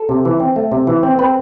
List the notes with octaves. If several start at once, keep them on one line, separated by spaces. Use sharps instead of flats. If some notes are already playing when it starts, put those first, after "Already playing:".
Already playing: A4
C3
E3
C4
A3
C3
E3
C4
C4 B4